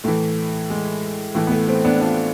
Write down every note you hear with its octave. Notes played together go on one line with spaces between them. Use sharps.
A2 E3 A3
G#3
A2 E3 A3
B3
A3
A3 C4
B3 D4
D4 F4